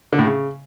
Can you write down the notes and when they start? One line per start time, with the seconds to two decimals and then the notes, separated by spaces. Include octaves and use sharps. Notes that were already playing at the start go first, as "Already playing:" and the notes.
0.13 D3
0.19 A2
0.25 C#3